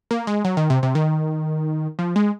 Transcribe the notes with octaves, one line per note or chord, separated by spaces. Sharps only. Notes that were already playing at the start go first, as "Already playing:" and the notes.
A#3
G#3
F#3
D#3
C3
C3
D#3
F3
G#3